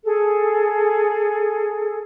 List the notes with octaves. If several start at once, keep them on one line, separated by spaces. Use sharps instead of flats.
G#4 A4